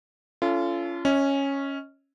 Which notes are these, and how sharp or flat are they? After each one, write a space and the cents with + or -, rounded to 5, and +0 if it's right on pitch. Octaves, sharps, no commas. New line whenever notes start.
C#4 +25 F4 -30 A4 +0
C#4 -5 D#5 +25